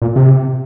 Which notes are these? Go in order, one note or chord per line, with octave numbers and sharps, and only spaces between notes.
A#2
C3